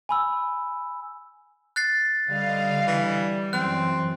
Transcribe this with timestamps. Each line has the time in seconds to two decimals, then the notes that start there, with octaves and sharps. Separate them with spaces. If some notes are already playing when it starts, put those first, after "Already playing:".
0.09 G#5 B5 E6
1.76 F#6 A6 C7
2.31 D3 G3 D#5 F5
2.87 E3
3.53 F#2 E3 C4 F#6